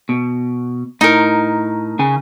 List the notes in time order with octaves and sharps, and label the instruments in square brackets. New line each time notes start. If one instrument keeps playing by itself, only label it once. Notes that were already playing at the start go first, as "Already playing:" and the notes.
[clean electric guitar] B2
[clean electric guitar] A2 [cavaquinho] D#4 A#4
[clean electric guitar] C#3 G#5